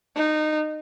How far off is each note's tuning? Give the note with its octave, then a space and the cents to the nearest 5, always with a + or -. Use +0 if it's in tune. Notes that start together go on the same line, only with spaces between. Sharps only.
D#4 -20